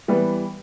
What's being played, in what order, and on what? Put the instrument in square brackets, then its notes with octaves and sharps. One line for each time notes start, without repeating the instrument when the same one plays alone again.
[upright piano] E3 G3 B3